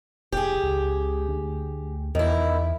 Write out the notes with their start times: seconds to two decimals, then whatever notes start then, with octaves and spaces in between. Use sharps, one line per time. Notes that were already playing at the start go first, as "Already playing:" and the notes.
0.32 F1 G4 G#4
0.63 C#2
1.28 D2
2.15 E2 D#3 E4